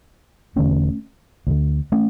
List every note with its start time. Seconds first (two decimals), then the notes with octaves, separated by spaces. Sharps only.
0.56 E1 E2 D3 A3 C#4
1.47 D2 D3
1.92 A3 C#4